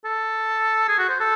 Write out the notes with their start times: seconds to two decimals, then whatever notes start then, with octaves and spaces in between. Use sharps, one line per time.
0.05 A4
0.88 G#4
0.99 F#4
1.09 C5
1.20 A4